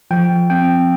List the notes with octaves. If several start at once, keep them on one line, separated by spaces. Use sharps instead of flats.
F3 G5
C4 G5